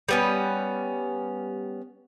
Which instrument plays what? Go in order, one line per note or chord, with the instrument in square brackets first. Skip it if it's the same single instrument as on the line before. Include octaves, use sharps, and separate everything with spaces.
[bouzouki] G3 B3 C#4